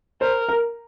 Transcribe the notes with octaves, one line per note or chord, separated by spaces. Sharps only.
A#4 C5
A#4